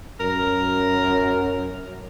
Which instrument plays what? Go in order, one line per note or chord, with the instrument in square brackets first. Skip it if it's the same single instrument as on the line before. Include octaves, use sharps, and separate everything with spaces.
[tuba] F#2 [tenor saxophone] A#4